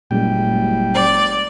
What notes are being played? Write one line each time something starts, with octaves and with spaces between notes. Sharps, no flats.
F#1 A#2 G3 G#3 G5
D5